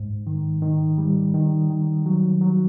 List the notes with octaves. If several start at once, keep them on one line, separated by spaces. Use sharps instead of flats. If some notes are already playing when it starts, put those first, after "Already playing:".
Already playing: G#2
D#3
D#3
G3
D#3
D#3
F#3
F#3